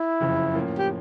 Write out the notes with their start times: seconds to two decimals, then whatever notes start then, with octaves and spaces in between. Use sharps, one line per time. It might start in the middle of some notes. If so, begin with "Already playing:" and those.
Already playing: E4
0.20 F#1 F2 C#3
0.54 A2 F3 A#3 C#4
0.78 G4